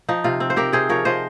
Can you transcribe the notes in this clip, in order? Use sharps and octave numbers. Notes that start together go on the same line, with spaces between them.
F3 D#4
C3 F4
C4
C5
C4 G4 A#4
C3 G#4 C5
F3 A#4 C#5
F3 C5 D#5